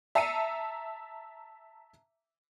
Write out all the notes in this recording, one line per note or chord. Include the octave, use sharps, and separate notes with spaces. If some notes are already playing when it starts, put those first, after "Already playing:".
E5 A5 A#5 C7 C#7 D#7